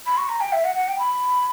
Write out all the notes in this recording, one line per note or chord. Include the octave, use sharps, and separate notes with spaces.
B5
C#6
A#5
G5
E5
F#5
F#5
G5
B5